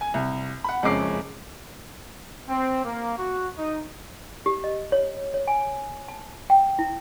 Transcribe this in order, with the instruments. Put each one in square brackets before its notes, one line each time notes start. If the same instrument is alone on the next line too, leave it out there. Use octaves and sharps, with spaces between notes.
[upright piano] G#5
C2
F#5 B5
F#1 F2 G#3 C#4 D6 C7
[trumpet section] C4
A#3
F#4
D#4
[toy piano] G4
D#5
C#5
C#5
G#5
A5
G5
E4